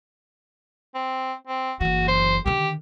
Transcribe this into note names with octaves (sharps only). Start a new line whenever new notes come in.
C4
C4
F#1 E3 F#4
C5
D3 D#3 G4